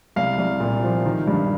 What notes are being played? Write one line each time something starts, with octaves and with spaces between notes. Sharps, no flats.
C2 F5
C2
A#2
F3
D#3
G2